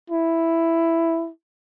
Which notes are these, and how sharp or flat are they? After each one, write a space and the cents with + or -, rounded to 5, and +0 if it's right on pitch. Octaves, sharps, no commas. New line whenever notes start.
E4 +5